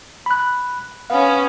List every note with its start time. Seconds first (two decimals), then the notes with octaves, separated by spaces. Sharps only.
0.26 B5 F#6
1.10 B3 C#4 F5